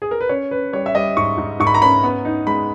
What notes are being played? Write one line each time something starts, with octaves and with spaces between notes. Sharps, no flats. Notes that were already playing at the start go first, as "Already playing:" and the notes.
G#4
A#4
B4
C#4 C#5
C#4 B4
G3 C#5
E5
G3 D#5
G#2 C#6
G#2
G#2 C#6
B5
A#5
C#4 B5
B3
D#4
G#3 B5